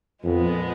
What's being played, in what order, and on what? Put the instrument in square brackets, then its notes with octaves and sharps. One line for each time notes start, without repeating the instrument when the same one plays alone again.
[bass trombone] F2 [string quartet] A#2 F3 G#3 B3